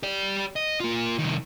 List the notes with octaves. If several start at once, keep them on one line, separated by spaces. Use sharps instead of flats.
G4 D5
D#5
A#3 F4
C2 D#3